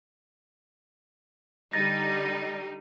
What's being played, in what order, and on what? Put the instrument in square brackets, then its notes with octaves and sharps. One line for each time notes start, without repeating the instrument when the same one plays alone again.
[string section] D3 G3 D#4 [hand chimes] A6 A#6